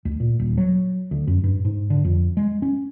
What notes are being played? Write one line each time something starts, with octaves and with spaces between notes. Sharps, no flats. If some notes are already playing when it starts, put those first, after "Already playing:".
D2
A#2
D#1
F#3
D2
F#2
G2
G#2
D3
F2
G#3
C#4